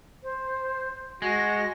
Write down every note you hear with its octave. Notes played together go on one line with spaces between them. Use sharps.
C5
G#3 F#4 A#6